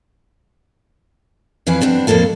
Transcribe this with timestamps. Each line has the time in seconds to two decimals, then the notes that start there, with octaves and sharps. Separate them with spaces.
1.67 F2 E3 B4 F5 G#5
1.81 G2 B3 C4 D4
2.07 F2 A2 A#3 A4 F5